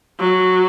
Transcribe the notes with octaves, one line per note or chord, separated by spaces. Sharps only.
F#3